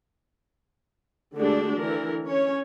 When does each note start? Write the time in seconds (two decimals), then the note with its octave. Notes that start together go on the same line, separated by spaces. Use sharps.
1.36 D3 G#3 A3 D4 F#4 G4
1.77 D3 E3 A#4
2.26 C#4 C#5